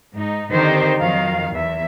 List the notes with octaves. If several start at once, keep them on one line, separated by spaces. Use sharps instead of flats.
G#2 D#4
D3 D#3 C4 D#4 G4 C5
F2 D#3 F#3 F5
E2 E5